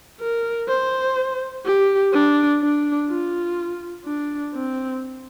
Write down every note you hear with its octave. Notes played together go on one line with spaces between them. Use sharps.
A#4
C5
G4
D4
D4
F4
D4
C4